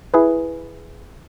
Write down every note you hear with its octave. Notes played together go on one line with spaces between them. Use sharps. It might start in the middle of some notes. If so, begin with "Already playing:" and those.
E4 G#4 B4